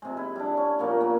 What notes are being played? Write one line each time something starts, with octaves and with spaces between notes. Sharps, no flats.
C3 G#3
E4
G3 D4
C#4
A#2 A#3 B3 C#4
A#3